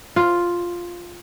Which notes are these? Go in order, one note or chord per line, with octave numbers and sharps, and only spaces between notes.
F4